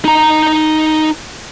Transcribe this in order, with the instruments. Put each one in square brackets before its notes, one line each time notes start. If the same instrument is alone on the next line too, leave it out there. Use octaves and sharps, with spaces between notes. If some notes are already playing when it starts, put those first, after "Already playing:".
[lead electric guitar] D#4 A#5